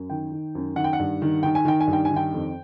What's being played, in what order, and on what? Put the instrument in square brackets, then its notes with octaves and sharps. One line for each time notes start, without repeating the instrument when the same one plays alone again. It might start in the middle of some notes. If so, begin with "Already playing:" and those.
Already playing: [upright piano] F#2
D#3 G5
D#3
F#2
D#3 F#5
G5
F#5
G2
D#3
D#3 G5
G#5
D#3 G5
G#5
G2
G5
G#5
D#3
G5
F2